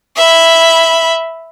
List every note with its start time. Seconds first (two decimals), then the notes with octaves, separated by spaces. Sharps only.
0.16 E5 B5